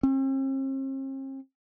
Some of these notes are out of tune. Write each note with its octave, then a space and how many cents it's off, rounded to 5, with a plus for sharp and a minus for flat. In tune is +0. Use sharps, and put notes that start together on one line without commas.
C4 +45